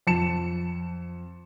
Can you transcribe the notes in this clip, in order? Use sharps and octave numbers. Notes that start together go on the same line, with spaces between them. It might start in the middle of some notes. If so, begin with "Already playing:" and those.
F2 A5 C#7 E7